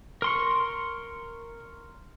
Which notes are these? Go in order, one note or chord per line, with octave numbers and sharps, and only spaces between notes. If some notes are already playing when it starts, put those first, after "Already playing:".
A#4 C6 C#6